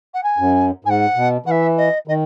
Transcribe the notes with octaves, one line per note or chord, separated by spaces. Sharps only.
F#5
G#5
F#2
G#2 F#5 G#5
B2
E3 E5 F#5
D#5
D#3 D#5